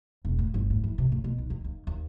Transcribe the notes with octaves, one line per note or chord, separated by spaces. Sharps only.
E1
A2
G1
A2
E3
C3
A#2
B2
B1
D#2
D#2
D#2